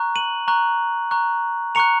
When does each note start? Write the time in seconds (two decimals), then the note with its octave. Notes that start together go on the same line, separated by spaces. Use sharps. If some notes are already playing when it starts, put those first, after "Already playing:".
Already playing: A#5 C#6 F#6
0.16 D#7 F#7
0.48 A#5 C#6 F#6
1.11 A#5 C#6 F#6
1.75 A#5 C#6 F#6 C#7 F7